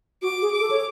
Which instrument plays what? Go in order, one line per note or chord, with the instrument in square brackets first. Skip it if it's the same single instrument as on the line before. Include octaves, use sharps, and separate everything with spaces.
[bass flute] F#4 [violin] D6
[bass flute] G#4
[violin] D6
[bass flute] A4
C#5